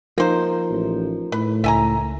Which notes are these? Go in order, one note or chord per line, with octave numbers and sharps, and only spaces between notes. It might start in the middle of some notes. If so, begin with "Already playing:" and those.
F3 A#3 D#4 A#4 C5
A1
A2 B4
C#2 E5 G#5 A#5